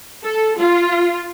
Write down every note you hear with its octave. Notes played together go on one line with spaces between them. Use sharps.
A4
F4